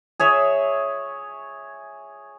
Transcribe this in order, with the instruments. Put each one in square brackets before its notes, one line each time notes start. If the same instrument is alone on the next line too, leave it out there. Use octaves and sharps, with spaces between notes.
[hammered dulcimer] G#4 C#5 E5